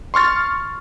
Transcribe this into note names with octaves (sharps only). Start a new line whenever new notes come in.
C6 C#6 F6 A6